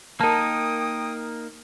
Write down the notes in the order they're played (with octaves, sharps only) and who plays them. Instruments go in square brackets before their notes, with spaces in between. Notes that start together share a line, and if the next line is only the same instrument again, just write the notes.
[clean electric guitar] A#3 D#4 [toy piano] A#4 A5 [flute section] G5 D#6